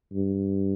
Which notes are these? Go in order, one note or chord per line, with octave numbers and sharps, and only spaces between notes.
G2